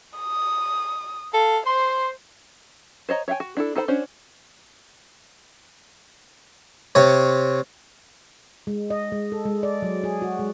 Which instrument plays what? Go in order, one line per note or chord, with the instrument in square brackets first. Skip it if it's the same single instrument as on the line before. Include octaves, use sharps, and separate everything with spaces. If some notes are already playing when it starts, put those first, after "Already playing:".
[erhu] D#6
[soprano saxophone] A4 [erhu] F5
[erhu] C5 [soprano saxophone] C6
[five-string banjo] C5 C#5 D#5 A#5
C#5 E5 F5 G5 G#5
F#4
D4 E4 A4
D#4 A4 C5 G5 B5
C#4 D4 F#4 C5 C#5
[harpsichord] C3 C#5
[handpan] G#3
D#5
G#3
A4
G#3
D5
F#3
G#4
F#4
G#3